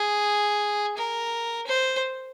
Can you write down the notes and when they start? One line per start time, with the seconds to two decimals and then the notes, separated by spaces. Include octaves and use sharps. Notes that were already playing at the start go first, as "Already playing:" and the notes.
Already playing: G#4
0.97 A#4
1.67 C5